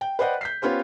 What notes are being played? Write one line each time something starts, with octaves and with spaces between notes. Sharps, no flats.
G5
B4 C5 D5 D#5 F#5 G5
G6 B6 C7
B3 C#4 F4 G4 C5